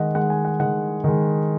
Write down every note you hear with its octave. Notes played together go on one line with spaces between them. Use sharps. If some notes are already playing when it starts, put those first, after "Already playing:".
Already playing: D#3 G#3 D#5 F#5
D#3 G#3 F#5
G#5
F#5
D#3 G#3 F#5
D#3 G#3